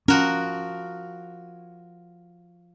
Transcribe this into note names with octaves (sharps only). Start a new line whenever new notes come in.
F3 C#4 F#4 A#4